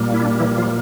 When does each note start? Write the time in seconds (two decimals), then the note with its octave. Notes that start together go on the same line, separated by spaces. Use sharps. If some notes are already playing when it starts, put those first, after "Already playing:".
Already playing: A#2 G3 A#3
0.13 E4
0.22 D4
0.39 E3 E4
0.58 F3 F4